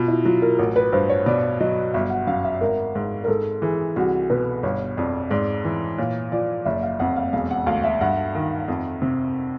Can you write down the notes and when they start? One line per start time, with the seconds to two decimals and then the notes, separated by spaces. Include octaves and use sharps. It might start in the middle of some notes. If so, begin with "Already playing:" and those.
Already playing: B2 F4
0.08 E4
0.25 F#3 F4
0.42 A#4
0.59 A1 A#4
0.76 B4
0.93 G2 C5
1.09 C#5
1.26 B2 D5
1.60 F#3 D#5
1.94 G1 E5
2.10 F#5
2.27 F#2 F5
2.44 E5
2.60 G#1 A#4
2.95 G#2
3.24 A#4
3.28 G#2 A4
3.62 E3 G#4
3.96 C2 F#4
4.30 B2 B4
4.63 G1 C#5
4.97 F2 D5
5.30 G#2 D5
5.65 E3
5.98 A#2 C#5
6.32 F3 D5
6.65 F#1 E5
6.83 F5
6.99 F2 F#5
7.16 F5
7.33 E1 F5
7.51 F#5
7.66 D2 F5
7.84 E5
8.01 G2 F#5
8.35 D#3
8.68 F2
9.02 C3